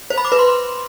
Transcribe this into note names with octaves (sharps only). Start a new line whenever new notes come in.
C5
B5
D6
B4
C6